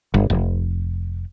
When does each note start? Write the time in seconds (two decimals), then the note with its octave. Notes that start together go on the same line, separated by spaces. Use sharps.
0.14 G1
0.30 F1